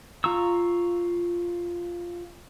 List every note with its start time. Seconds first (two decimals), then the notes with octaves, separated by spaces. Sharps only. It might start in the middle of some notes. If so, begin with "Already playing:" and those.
0.24 F4 A#5 C#6 E6